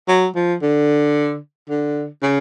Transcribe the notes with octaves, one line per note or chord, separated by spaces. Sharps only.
F#3
F3
D3
D3
C#3